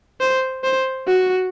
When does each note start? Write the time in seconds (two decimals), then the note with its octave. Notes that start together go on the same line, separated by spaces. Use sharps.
0.21 C5
0.64 C5
1.07 F#4